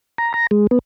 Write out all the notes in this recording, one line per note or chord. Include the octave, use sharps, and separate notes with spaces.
A#5
A#5
G#3
B3